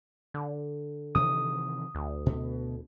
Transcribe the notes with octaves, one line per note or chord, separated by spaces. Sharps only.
D3
C3 D#3 E3 D#6
D2
B2